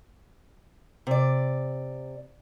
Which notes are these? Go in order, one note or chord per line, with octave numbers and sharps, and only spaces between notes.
C3 D5